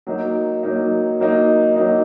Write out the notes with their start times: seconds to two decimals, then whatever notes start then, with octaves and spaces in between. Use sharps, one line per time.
0.07 F#3 A#3 D#4
0.63 F#3 A#3 D#4
1.20 F#3 A#3 D#4
1.76 F#3 A#3 D#4